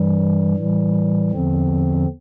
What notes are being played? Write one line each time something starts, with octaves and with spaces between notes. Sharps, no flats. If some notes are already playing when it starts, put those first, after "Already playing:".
Already playing: G2 E3 G3
A2 E3 G3
E2 D3 F3 C4